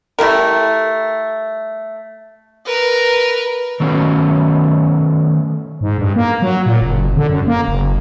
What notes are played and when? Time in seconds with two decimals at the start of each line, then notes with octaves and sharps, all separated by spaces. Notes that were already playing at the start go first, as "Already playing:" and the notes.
0.19 A3 E4 G4 A#4
2.65 A#4 B4
3.80 D#3 F#3 A3 B3 C#4
5.81 G#2
5.98 G2
6.16 A#3
6.42 F#3
6.66 A#2
6.82 F#1
7.17 D3
7.30 F#2
7.47 A#3
7.68 F#1